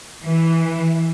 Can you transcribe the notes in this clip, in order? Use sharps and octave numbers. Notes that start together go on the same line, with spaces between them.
E3